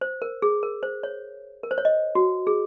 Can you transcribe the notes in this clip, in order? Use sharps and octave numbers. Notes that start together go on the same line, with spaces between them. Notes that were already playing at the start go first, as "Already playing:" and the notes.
C5
A#4
G#4
A#4
C5
C#5
A#4
C5
C#5
D#5
F#4
G#4